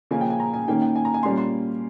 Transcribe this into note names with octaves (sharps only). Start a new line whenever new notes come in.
C#3 F3 A#3 C#4 G#5
G5
G#5
A#5
G#5
D#3 A#3 C#4 G5
G5
G#5
A#5
G#5
A#2 G3 A#3 C#4 C6
C6